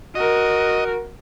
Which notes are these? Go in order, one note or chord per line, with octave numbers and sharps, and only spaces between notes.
F#4 A#4 D#5